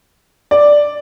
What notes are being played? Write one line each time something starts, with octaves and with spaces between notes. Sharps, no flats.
D5